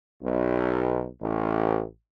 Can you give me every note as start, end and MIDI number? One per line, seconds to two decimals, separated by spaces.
0.22 1.03 35
1.20 1.82 33